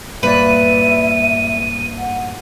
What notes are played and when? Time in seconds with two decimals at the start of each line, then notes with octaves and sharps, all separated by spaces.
0.23 G2 A#2 B4 D5 E5 D#7
1.98 F#5